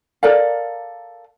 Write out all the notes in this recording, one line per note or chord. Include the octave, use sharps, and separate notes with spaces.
A4 A#4 D5 F5